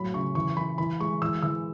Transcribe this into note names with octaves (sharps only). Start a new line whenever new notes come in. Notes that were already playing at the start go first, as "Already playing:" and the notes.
Already playing: A2 F#3 B5
C#3 C#6
E3 C#6
E3 B5
E3 B5
G#3 C#6
E3 E6
E3 E6